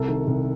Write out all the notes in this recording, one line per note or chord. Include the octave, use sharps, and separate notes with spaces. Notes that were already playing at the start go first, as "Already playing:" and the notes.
Already playing: C2 C3 A4
D#3
C2